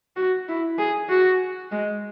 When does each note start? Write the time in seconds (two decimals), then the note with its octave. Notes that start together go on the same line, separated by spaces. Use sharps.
0.16 F#4
0.48 E4
0.78 G#4
1.09 F#4
1.72 G#3